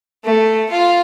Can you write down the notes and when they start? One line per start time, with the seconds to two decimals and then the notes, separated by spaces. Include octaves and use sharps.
0.25 A3
0.70 F4